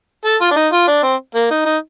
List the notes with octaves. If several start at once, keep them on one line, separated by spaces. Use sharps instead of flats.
A4
F4
D4
D#4
F4
D4
C4
A#3
D#4
D#4